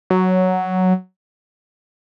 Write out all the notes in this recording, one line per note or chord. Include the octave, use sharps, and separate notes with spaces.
F#3